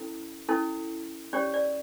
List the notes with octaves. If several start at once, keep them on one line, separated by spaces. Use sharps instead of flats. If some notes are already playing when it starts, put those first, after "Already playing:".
Already playing: C#4 E4 A4
C#4 E4 A4
C#4 G4 C#5 D5
D5